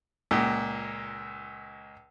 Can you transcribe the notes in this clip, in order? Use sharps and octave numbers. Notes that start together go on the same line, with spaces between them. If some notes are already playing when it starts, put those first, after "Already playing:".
C#2 A#2